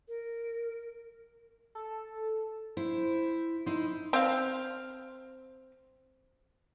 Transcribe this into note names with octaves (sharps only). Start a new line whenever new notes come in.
A#4
A4
E4 C5
D#4 E4 C6
C4 F5